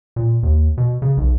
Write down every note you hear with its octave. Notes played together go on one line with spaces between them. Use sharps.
A#2
D#2
B2
C#3
B1